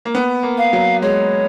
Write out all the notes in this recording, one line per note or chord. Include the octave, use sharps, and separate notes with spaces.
A#3
B3
A#3
F5
F#3
G#3 C#5